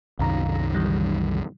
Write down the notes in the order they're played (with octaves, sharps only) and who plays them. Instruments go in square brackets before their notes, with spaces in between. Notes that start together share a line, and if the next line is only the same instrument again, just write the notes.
[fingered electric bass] C2 F#2 D#3 [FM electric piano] F5 A#5 A#6
[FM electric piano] D3 E3 G3